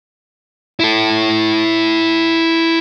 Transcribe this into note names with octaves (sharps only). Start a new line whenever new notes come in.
E4 A4